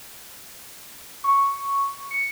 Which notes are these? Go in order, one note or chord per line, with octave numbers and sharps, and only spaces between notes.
C#6
C#7